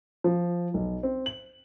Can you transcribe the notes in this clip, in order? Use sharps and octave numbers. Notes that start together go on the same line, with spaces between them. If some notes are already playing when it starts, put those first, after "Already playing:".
F3
B1
C4
F#7